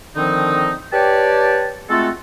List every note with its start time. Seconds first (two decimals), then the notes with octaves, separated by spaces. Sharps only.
0.16 D3 D#3 F3 C4 D#4
0.93 G4 B4 C#5 D5 G5 A5
1.89 G#3 A3 C4 F4 F#4 A4